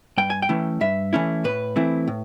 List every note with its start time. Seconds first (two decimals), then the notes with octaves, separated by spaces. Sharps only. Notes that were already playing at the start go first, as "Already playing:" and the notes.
0.18 G2 G5
0.30 G#5
0.42 G5
0.49 E3 A3 C#4 E4
0.81 G2 E5
1.13 E3 A3 C#4 E4
1.44 A2 B4
1.76 E3 A3 C4 E4
2.08 A2